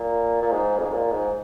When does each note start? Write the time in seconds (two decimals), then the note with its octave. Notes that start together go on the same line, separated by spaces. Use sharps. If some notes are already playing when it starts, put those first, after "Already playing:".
Already playing: A#2
0.42 A#2
0.52 G#2
0.78 F2
0.85 G#2
0.93 A#2
1.12 G#2